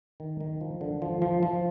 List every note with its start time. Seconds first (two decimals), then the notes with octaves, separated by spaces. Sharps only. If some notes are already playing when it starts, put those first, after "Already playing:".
0.20 D#3
0.40 D#3
0.61 F3
0.81 D3
1.02 F3
1.22 F3
1.43 F3